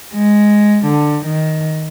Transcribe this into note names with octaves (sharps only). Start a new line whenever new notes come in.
G#3
D3
D#3